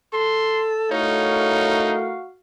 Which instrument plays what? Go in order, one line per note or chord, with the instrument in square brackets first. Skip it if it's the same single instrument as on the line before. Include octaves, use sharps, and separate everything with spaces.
[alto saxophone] A4 [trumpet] C6
[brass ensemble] A3 E4 A#4 [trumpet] D#4 [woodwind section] F#4 F5 [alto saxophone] C#5